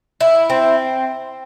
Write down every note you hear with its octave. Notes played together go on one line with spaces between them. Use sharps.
E4
C4